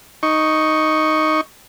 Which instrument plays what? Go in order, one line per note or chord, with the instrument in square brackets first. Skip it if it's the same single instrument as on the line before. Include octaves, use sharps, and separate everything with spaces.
[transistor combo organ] D#4 C#6